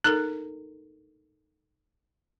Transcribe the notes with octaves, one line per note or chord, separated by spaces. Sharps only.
D#4 A4 A#4 F#6